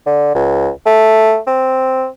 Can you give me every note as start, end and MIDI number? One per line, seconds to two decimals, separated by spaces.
0.06 0.31 50
0.35 0.69 37
0.86 1.38 57
1.47 2.07 60